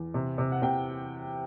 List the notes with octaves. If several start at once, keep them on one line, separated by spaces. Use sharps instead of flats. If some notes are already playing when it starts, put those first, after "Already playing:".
Already playing: E2
C3
C3
F#5
C3 G5